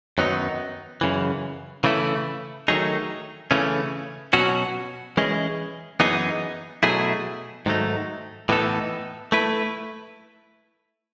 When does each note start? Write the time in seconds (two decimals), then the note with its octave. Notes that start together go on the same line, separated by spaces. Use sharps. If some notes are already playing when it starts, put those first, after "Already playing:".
0.18 F#2 D#3 F#3 B3 D#4
1.01 F#2 C#3 E3
1.84 C#3 E3 A3 E4
2.68 D#3 F#3 A3 D#4 G#4
3.51 C#3 E3 A3 C#4
4.33 B2 F#3 C#4 F#4
5.17 E3 G#3 C#4 G#4 D#5
6.00 F#2 E3 B3 D#4 G#4
6.83 B2 F#3 A3 E4 G#4
7.66 G#2 D#3 F#3 A3 D#4
8.49 A2 E3 B3 D#4 A4
9.32 A3 E4 B4